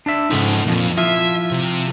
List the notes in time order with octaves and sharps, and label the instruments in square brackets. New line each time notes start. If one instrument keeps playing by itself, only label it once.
[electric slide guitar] D4 D5 E5
[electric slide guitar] G#2 C#3 F3 [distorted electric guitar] D#4 A4
[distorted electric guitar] F2 [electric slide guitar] A#2 F3
[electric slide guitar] F3 E4 F4 [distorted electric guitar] E5
[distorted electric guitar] C3